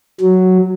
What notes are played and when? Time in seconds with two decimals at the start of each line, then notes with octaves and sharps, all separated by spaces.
0.21 F#3